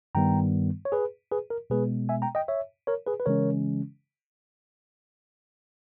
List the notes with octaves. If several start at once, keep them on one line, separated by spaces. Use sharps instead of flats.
G2 D#3 G3 B3 G5 A#5
C#5
G#4 B4
G#4 B4
A#4
B2 G#3 B3 G#4 B4
E5 G#5
G5 A#5
D#5 G5
C#5 E5
A#4 C#5
G#4 B4
B4
C#3 E3 G#3 C#4 A#4 C#5